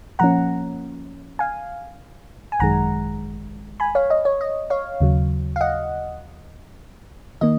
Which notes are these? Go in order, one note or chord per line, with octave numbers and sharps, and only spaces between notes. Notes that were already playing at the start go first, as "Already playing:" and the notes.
A#2 F3 A#3 C#4 F#5 A#5
F5 G#5
G#5
G#1 F#2 D#3 G#3 F#5 A#5
G#5 B5
C#5 F5
D#5
C#5
D#5
C#5 F5
D#2 C#3 F#3
F5
D#5 F#5
D#3 A#3 D#5